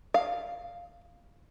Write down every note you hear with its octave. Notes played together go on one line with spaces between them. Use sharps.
F5